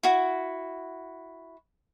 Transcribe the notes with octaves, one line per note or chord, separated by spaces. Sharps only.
E4 F#4